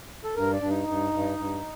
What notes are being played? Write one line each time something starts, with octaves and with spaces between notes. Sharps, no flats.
A4
G2 A#4
D5
G2 D4
D#4
G2
G2
G2